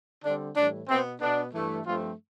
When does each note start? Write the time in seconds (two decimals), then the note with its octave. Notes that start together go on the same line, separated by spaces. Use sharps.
0.24 D3 G3 C4 D4
0.56 A2 E3 G3 D4
0.89 B2 B3 C4
1.20 B2 B3 D4
1.53 G2 E3 A3
1.85 G2 F3 A3 C4 F4